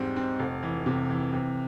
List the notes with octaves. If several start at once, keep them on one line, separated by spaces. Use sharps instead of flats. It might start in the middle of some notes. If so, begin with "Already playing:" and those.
Already playing: E2 G#2 G3 C4
C4
F1
E3
C3
E3
C3